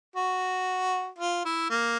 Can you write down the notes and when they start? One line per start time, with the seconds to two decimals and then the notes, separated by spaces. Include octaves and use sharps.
0.16 F#4
1.19 F4
1.45 E4
1.70 A#3